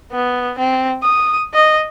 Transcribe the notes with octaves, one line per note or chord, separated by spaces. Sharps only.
B3
C4
D#6
D#5